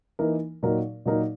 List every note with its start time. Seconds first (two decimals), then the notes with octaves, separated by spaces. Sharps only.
0.19 E3 A#3 D#4 A#4
0.63 A#2 F#3 A#3 D#4 A#4
1.05 A#2 F#3 A#3 D#4 A#4